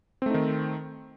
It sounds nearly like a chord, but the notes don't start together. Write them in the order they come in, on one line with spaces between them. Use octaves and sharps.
C4 A3 D#4 D#3